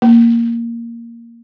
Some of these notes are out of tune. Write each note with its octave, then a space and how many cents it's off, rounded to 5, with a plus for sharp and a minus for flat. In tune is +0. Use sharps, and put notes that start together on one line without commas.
A#3 -5